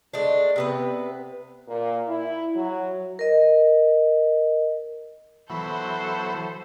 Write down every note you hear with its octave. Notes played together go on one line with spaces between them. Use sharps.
G#3 A3 D4
C3 B3 B4
A#2
E4
F#3
A#4 D#5
E3 F#3 B3 A4 C5